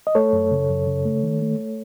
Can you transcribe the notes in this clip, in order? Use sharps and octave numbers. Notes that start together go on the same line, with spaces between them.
D#5
A3 A4 C#5
F#2
C#3
F#2
C#3
A3
D#3
A3
A3